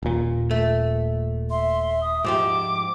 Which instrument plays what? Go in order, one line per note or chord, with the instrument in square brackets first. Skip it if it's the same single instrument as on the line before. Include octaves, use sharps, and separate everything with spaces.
[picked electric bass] D#1 A#2
[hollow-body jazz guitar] A3
[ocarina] E5 [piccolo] C6
[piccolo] D#6
[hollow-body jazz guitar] G#2 F3 G4 [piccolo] D6